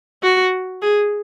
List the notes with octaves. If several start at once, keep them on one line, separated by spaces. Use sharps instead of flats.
F#4
G#4